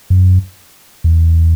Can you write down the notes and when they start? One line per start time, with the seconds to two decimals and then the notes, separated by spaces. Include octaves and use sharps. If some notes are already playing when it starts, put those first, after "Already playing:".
0.10 F#2
1.04 E2